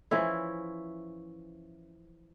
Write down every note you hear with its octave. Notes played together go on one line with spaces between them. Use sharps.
E3 F3 C#4 E4